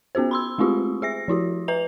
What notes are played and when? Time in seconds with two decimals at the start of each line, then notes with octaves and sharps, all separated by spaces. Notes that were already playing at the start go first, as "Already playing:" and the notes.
0.15 B3 C#4 F#4 G#4 C5
0.31 B5 C6 E6
0.58 G#3 A3 C4 F4 G4 G#4
1.02 G#4 E5 A#6
1.28 F3 E4 F#4 G4
1.68 B4 E5 A#5 F7